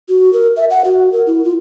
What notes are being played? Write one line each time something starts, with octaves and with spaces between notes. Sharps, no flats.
F#4
A#4
E5
F#5
F#4
A#4
E4
F4